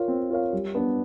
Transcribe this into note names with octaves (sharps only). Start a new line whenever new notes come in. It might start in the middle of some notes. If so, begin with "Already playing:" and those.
Already playing: F4 A#4 C#5 F5
C4
F4 A#4 C#5 F5
G3
B3 D4